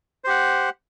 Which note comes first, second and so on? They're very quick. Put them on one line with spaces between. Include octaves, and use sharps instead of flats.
C5 G4 F#5